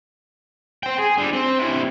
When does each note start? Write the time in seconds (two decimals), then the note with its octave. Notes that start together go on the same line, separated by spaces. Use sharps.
0.83 C5 G5
0.99 G#4
1.18 D3 G3
1.33 C4
1.59 C3 E3